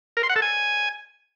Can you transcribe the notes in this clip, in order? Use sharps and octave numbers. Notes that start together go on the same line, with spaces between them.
A#4
C6
F#5
A4
G#5